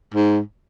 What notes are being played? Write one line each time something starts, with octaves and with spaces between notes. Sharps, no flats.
G#2